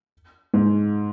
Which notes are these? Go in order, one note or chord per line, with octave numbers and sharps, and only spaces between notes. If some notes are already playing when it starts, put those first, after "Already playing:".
G#2